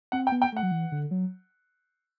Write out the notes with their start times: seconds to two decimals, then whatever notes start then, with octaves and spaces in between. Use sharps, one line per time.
0.12 C4 F#5
0.27 G5
0.32 B3
0.42 G5
0.52 A3 F#5
0.63 F#3
0.71 E3
0.92 D3
1.11 F#3